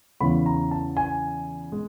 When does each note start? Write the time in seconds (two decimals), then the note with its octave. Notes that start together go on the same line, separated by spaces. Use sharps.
0.20 E2 C#3 E3 B5
0.46 A#5
0.71 A5
0.97 G#5
1.72 G#3